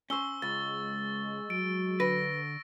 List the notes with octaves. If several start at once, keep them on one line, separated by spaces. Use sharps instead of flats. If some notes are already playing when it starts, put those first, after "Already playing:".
C#4 C5 C#6 E6 G7
C#2 G#3 A6
F#3 D7
D3 B4 A#6